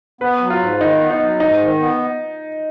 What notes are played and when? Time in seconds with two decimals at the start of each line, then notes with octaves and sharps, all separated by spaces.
0.21 B3 B4
0.41 F#3
0.50 F4
0.60 G#2
0.81 D#3 D#4
1.00 B3
1.10 D#4
1.20 F#3
1.40 G#2 D#4
1.60 D#3
1.80 B3